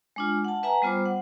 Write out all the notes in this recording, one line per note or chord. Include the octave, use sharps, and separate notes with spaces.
G#3 D4 F4
F#5 A5
B4 E5 F#5 G#5 A#5
G3 B3 F4 C5 D6
F#5